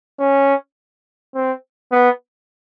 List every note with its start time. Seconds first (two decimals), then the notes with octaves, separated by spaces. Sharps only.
0.20 C#4
1.34 C4
1.92 B3